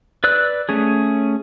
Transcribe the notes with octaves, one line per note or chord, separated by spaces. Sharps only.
B4 D5 E6 F#6
A3 C#4 G#4